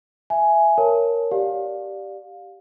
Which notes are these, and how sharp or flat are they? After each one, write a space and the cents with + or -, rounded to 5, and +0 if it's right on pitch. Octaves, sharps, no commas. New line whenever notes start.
E5 +15 G#5 +10
A#4 +0 C#5 +0 A5 +0
G4 -5 D5 +0 F5 +20